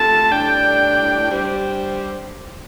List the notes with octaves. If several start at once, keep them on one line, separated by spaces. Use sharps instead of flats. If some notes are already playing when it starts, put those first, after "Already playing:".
Already playing: C3 A3 F4 A4 A5
A2 G3 D4 G5
G3 D4 G4 C5